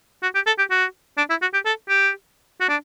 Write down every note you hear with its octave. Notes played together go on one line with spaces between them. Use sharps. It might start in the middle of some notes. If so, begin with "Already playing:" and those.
F#4
G4
A4
G4
F#4
D4
E4
F#4
G4
A4
G4
F#4
D4